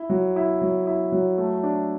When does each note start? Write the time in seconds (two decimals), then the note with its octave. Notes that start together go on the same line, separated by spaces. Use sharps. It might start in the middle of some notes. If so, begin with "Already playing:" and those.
Already playing: E4
0.10 F#3
0.36 E4
0.61 F#3
0.87 E4
1.12 F#3
1.38 A3
1.63 D4